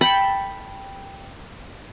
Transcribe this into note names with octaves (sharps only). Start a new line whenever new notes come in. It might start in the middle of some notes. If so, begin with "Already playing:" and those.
A4 G5 A5 B5